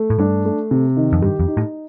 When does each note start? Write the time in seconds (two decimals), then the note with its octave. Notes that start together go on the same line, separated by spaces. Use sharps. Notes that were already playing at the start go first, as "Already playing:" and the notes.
Already playing: A3
0.10 A2
0.19 G2 D4
0.46 A3
0.71 C3
0.97 D#3
1.13 F2
1.22 G2 G4
1.39 F2
1.48 D#4
1.57 A2